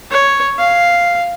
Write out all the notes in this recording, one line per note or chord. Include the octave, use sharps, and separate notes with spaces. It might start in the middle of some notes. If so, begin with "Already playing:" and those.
C#5
F5